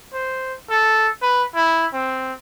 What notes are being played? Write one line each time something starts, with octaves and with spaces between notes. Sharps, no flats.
C5
A4
B4
E4
C4